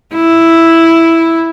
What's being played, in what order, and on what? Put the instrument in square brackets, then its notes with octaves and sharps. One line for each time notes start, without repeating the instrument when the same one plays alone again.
[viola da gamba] E4